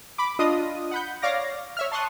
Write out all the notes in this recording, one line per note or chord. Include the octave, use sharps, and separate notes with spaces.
B5 D6
D4 F4 D#5 D#6
F#5 B5 G6
C#5 D5 F5 D6 A#6
C#5 E5 F6
A5 C6 C#6 D#6 F#6